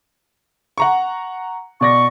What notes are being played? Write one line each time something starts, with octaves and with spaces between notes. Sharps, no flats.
F#5 A#5 C#6
B2 D5 C#6 A#6